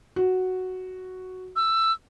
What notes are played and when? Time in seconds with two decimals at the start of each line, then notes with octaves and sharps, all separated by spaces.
0.16 F#4
1.56 E6